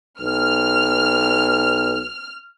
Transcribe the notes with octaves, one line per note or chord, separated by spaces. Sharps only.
B1 F6